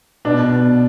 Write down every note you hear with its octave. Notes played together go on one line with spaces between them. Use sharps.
B2 D4
B2